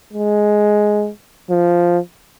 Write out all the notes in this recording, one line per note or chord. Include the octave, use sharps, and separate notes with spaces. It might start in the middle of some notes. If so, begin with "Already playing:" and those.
G#3
F3